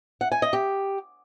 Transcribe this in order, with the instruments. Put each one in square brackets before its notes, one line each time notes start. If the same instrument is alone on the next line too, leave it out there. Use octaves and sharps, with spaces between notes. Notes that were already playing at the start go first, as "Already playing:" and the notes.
[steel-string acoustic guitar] F#5
G#5
D#5
G4